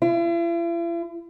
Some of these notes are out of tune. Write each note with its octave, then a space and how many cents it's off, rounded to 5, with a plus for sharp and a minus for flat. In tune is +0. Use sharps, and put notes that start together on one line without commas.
E4 +45